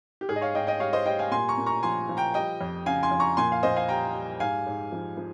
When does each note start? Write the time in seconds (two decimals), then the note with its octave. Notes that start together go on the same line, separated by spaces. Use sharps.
0.21 G4
0.29 G#2 G#4
0.36 D#5
0.41 C#5 F5
0.54 G#2 D#5 G5
0.67 D#5 G5
0.80 G3 C#5 F5
0.93 C5 D#5
1.06 G3 D#5 G5
1.19 F5 G#5
1.31 A#2 G#5 C6
1.48 A#5 C#6
1.58 A#2
1.66 A#5 C#6
1.83 F3 G#5 C6
2.09 F3
2.17 G5 A#5
2.34 G3 D#5 G5
2.61 F2
2.86 C#3 F5 G#5
3.03 G#5 C6
3.11 F2
3.20 A#5 C#6
3.37 A#2 G#5 C6
3.52 F5
3.63 A#2 C5 D#5
3.76 F5 G#5
3.89 G3 G5 A#5
4.15 G3
4.40 G#2 F5 G#5
4.67 G#2
4.92 F3
5.17 F3